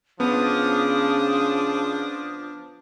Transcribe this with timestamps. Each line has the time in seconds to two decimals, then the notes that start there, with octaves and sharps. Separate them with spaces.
0.20 C#3 F3 B3 D4 D#6